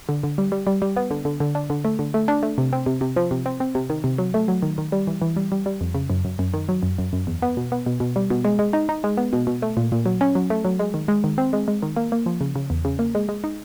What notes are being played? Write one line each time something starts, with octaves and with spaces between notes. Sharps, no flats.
D3
D3
G3
G3
G3
G3
B3
D3
D3
D3
D4
D3
A3
D3
A3
D4
A3
C3
C4
C3
C3
F3
C3
C4
C4
C3
D#3
C3
F#3
A3
F#3
D#3
D#3
G3
E3
E3
G3
G3
G3
F2
C#3
F#2
F#2
F#2
D#3
F#3
F#2
F#2
F#2
E2
B3
B2
B3
B2
B2
G3
B2
G#3
G#3
D#4
D#4
G#3
B3
B2
B2
A3
A#2
A#2
F#3
C#4
F#3
A3
F#3
G#3
D#3
G#3
D#3
C4
G#3
G#3
D#3
A#3
A#3
F3
C#3
C#3
E2
C#3
A#3
G#3
G#3
D#4